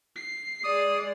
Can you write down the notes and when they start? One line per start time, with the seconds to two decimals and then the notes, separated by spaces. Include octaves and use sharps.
0.16 C7
0.64 G#3 D5 D#6